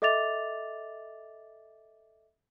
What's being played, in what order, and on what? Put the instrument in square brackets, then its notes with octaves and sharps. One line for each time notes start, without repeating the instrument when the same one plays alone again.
[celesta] A4 D#5 E5 D6 A6 F7